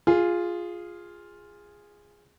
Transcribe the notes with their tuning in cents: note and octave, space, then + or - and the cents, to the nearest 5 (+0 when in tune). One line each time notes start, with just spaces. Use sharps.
F4 +0 G#4 -10